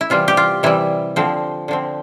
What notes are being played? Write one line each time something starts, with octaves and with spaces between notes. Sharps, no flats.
E4
C3 E3 G3 F4
G4
F4
C3 E3 G3 E4
D3 F3 C4
D3 F3 C4